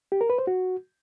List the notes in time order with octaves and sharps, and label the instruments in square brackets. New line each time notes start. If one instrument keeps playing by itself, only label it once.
[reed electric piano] G4
A#4
B4
C5
F#4